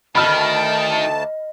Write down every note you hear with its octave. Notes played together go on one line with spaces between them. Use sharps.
D2 D#3 D#5 A5 B5 F6